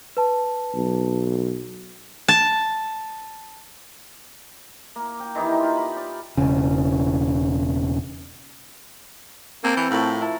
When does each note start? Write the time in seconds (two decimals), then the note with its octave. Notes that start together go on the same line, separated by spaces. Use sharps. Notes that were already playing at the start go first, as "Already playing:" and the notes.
0.17 B4 A5
0.75 B1
2.28 A5
4.96 A#3
5.20 G5
5.35 D#3 E3 D#4 G4
5.60 F4
5.77 B5
5.96 D5
6.37 E1 C#3
9.64 A#3 C4 A4
9.77 E3
9.90 A2 F3 A#4 C#5
10.21 E4 A#4 A5